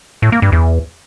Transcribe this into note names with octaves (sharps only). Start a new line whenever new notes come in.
A2
A#3
G2
E2